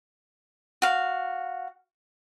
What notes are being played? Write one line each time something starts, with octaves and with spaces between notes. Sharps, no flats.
F#4 F5